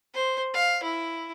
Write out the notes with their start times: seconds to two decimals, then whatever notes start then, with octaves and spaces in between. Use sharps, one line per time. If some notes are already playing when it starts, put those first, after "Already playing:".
0.14 C5
0.54 F5
0.83 E4